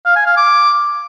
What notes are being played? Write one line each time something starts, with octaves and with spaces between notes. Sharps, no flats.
F5
G#5
F5
D6